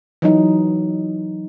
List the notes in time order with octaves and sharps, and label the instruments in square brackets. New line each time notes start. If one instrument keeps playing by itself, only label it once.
[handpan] E3 F#3 D#4